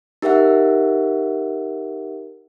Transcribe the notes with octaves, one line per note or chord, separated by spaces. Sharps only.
D#4 G4 A#4 E5 F#5